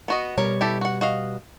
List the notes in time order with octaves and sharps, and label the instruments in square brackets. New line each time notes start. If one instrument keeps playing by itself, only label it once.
[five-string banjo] B3 F#4 D#5
[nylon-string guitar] B2 G3 C#5 [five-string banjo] A#4
[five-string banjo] E4 G4 A4
F#4 F#5
F#4 D#5 F5